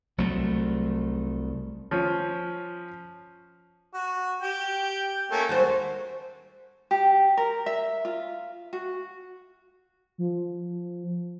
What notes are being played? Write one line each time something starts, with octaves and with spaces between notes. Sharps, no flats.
C2 F#3 A3
F3 C#4
F#4
G4 G5
A3 A#3 C#4
D#2 G3 F#4 C5
G4
A#4
E5
F4
F#4
F3